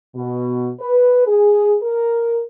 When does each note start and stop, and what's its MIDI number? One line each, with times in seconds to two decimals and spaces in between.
0.15 0.70 47
0.80 1.24 71
1.27 1.76 68
1.83 2.42 70